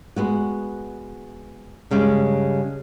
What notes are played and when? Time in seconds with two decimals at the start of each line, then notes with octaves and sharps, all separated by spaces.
0.16 G#3 B3 F#4
1.91 G2 C#3 G3 G#3